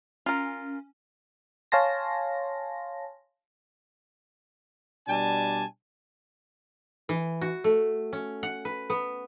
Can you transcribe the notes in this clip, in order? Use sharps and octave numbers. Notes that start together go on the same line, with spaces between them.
C#4 F4 A#4
C#5 F5 G#5 A5 C6 A#6
B2 G3 D4 G#5 A5
E3
F#4
A3
C#4
F#5
B4
B3